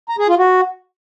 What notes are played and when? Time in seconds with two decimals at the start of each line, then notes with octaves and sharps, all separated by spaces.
0.09 A#5
0.19 G#4
0.28 F4
0.38 F#4